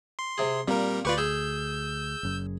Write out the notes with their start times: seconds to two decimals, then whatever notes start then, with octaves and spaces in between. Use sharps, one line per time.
0.19 C6
0.38 C3 G#4
0.68 A#2 G3 C4 A#4
1.05 D2 F4 G4 B4 D5 C#6
1.18 G#4 E6 G6
2.23 F#1 F#2